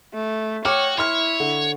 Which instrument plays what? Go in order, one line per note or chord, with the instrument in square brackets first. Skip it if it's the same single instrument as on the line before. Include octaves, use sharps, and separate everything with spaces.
[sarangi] A3
[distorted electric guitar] F#4 [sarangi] C#5 [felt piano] G5 D6 F6
[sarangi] E4 [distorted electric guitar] C#5 [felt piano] C6 F6
[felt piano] D3